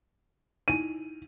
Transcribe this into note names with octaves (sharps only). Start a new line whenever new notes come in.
D#4 E4 G#5 D#7